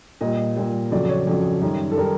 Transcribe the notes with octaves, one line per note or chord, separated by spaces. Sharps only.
A#2 G3 D#5
A#2 G3
F2 C#3 F#3 D5
C#5
F2 C#3 F#3
F#2 D#3 G3
A4
D#3 G3 A#4